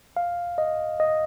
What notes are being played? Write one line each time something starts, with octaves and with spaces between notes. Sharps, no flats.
F5
D#5
D#5